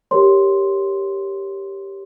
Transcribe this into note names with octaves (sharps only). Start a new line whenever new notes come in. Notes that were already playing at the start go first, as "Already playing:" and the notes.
G4 A#4 C#5 C6